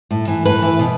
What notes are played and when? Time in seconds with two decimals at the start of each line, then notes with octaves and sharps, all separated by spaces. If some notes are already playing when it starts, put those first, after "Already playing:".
0.11 A2
0.28 E3
0.45 A2 B4
0.62 E3
0.79 B2